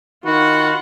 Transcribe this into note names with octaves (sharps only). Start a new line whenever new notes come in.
D#3 F4 F#4 F#5 B5 C#6